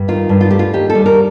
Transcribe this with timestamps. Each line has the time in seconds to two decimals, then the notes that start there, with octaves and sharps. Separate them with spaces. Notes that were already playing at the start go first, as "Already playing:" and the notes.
Already playing: G2
0.08 D#3 F4
0.29 G2
0.41 F4
0.50 A3 G4
0.59 F4
0.73 D#2 G4
0.90 A4
0.95 G3
1.06 A#4